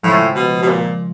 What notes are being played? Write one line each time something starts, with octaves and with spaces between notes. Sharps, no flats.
A2 C#3 F3 G#3
B2
B2
A#2